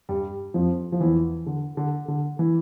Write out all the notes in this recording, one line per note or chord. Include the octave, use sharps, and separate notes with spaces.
G2 G3
F2 F3
F3
E2 E3
D3
D3
D3
E3